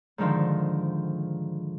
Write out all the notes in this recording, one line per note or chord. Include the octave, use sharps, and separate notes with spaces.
G#2 D3 D#3 F3